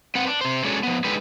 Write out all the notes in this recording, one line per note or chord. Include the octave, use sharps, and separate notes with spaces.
C4 B4 F#5
D4
C3 C5
G#3 C#4 D4 F#4 A4 C#5
F3 B3
D3 G#3 D#4 G4 B4